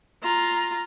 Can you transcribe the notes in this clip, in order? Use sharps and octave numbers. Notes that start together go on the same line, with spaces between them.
F4 A#5